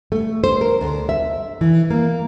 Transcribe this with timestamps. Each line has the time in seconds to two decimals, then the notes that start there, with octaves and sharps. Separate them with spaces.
0.12 A3
0.44 C5
0.61 A#4
0.81 D2
1.09 E5
1.61 E3
1.90 A#3